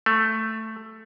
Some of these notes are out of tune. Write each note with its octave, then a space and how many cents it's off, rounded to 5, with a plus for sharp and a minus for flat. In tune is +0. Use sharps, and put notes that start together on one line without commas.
A3 +5